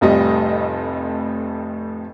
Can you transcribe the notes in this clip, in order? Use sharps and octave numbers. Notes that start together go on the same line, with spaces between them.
F1 F2 A2 G3 D#5